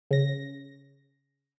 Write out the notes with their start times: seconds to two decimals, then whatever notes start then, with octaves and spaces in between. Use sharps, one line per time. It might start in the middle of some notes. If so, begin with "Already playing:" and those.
0.11 C#3 A#6